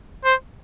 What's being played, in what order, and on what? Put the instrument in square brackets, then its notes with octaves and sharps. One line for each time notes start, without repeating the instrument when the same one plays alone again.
[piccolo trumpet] C5